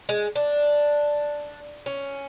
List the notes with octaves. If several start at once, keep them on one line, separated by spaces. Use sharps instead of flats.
G#3
D4
C#4